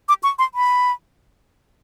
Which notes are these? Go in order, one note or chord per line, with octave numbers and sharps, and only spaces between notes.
D6
C#6
C6
B5